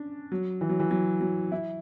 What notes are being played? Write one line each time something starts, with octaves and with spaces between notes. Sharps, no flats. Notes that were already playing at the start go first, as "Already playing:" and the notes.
Already playing: C#4 D4
F#3
E3
F#3
E3
F#3
F#3
E4